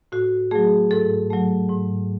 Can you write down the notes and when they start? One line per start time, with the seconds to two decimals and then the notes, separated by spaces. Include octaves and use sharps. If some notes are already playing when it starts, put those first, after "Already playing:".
0.12 A2 F#4
0.51 F#3 A3 G#4
0.91 G#2 A4
1.30 F#3 A3
1.69 G#2